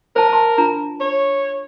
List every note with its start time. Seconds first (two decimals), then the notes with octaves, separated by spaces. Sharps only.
0.16 A#4 C5 A5
0.29 A5 C6
0.58 D4 F4 A#5
1.01 C#5